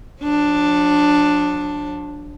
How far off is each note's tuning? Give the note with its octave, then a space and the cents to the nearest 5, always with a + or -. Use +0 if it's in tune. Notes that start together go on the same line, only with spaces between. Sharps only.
F#3 -45 D4 +5